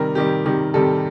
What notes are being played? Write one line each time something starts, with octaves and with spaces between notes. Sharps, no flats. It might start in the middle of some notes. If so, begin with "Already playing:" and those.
Already playing: C3 D#3 G3 A#4
C3 D#3 G3 G4
C3 D#3 G3
C3 D#3 G3 A4